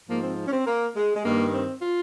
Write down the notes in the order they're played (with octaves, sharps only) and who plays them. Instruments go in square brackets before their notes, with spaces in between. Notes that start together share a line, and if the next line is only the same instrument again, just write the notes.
[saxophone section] G#2 F3 A#3
C4
C#4
C4
A#3
G#3
G#3
G2 D#3 A#3
C4
F4